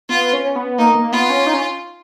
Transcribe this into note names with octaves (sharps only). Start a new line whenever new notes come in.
B3 F4
C#4
B3
A#3 D#4
A#3
B3 F4
C#4
D#4
C#4